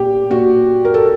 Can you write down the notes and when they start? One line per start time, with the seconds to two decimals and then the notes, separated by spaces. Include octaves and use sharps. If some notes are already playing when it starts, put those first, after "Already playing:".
Already playing: A#2 G4
0.30 A#2 F#4
0.85 A#4
0.94 A4